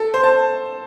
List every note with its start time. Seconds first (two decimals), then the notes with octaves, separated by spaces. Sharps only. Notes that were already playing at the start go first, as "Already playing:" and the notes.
Already playing: A4
0.14 C5
0.23 A5